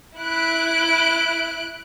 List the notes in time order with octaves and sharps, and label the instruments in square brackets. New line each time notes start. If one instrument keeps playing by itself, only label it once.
[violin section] E4 F#6 D7